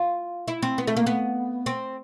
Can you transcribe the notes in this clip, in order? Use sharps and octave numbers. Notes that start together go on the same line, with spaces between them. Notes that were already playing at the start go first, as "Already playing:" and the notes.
Already playing: F4
E4
C4
B3
A3
A#3
B3
C4